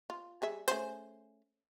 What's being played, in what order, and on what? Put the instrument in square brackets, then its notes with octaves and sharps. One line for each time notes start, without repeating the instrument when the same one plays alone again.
[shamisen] F4
G3 G#4 E5
[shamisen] A3 C#4 G#4 [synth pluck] C5